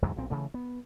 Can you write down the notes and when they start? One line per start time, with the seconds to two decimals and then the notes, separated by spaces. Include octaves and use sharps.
0.02 E2 G#2 D3 F#3
0.17 B1 A#2 C4
0.30 C#3 E3 A3
0.54 B3